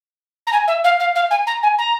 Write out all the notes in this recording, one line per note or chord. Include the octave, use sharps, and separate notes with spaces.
A#5
G#5
E5
F5
F5
F5
G#5
A#5
G#5
A#5